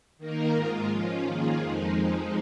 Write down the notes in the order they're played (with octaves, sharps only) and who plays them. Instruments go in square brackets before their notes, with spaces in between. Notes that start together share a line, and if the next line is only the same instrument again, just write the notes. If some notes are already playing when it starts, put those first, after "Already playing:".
[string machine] D#3 A#3 D#4 A#4
G#2 G#3 F4
F3 C#4 F4
D#3 A#3 F4 G#4
F2 F3 G#3 D#4